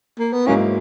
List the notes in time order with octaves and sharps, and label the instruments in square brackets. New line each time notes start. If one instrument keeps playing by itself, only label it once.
[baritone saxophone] A#3
B3
[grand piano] G#2 F#3 A#3 E4 [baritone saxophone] C#4